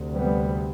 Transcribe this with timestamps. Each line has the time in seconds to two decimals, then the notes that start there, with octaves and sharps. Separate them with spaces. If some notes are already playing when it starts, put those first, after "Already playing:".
Already playing: D2 C3
0.15 G3 B3